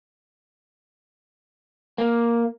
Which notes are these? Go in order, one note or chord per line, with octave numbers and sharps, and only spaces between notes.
A#3